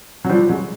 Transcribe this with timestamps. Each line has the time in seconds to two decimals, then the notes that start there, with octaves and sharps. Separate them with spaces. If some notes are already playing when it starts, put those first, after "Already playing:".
0.25 F#3
0.29 F3 G3
0.49 F#3 G#3